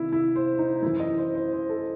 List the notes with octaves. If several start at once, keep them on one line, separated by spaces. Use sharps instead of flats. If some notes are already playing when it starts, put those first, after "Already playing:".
Already playing: C2 C3 D#3 E4
E4
C5
D#4
F#2 E3 E4
D#5
C5
C5
C5
A4